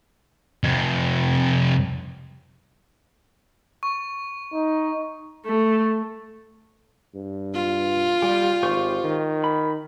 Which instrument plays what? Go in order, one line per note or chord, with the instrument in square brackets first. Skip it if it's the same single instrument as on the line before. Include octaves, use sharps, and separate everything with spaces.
[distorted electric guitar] F2 C3
[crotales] C#6
[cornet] D#4
[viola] A3
[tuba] G2
[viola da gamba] F4
[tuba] G3 [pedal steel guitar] G4
[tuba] G#1 [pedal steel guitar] G4 C5 C#6
[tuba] D#3
[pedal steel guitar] B5